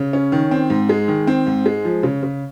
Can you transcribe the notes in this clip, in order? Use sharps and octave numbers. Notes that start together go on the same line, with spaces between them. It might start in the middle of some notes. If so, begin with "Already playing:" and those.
Already playing: C#3
C#4
D#3
C4
G#2
G#3
D#3
C4
G#2
G#3
F3
C#3
C#3